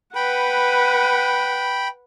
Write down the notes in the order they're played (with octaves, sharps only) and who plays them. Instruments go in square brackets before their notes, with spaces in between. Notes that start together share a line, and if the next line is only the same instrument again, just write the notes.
[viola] B4 F#5 [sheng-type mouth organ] G5 B5